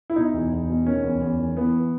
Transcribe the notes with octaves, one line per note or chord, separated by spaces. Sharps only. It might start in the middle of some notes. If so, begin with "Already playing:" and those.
E4
B2 D#4
E2
E2
B2
D#3 C#4
E2
E2
D#3
E3 B3